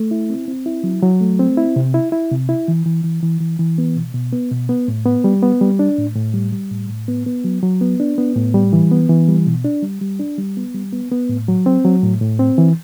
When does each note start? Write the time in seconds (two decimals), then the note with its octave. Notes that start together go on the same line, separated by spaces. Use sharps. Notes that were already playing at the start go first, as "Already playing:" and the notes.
Already playing: A3
0.11 E4
0.30 C4
0.48 C4
0.66 E4
0.84 F#3
1.03 F#3
1.21 A3
1.39 C4
1.57 E4
1.76 C3
1.94 E4
2.12 E4
2.31 C3
2.49 E4
2.68 E3
2.85 E3
3.04 E3
3.23 E3
3.40 E3
3.59 E3
3.78 B3
3.96 B2
4.14 B2
4.33 B3
4.51 B2
4.69 B3
4.88 A2
5.06 B3
5.24 G3
5.42 B3
5.61 G3
5.79 D4
5.98 A2
6.16 A2
6.34 G3
6.52 G3
6.71 A2
6.89 A2
7.08 B3
7.26 B3
7.44 F#3
7.63 F#3
7.81 B3
8.00 D4
8.18 B3
8.36 A2
8.54 G3
8.73 E3
8.91 B3
9.09 E3
9.28 G3
9.47 B2
9.65 D4
9.82 G3
10.01 G3
10.20 D4
10.38 G3
10.57 B3
10.74 G3
10.93 B3
11.11 B3
11.29 A2
11.48 F#3
11.66 C4
11.85 F#3
12.03 A2
12.21 A2
12.39 C4
12.58 E3